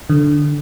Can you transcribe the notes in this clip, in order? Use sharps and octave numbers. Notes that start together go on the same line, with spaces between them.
D3